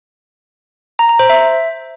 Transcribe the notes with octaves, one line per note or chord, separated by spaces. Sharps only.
A#5
A#5
C5
E5